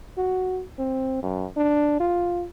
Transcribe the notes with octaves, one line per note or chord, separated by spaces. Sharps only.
F#4
C4
F#2
D4
F4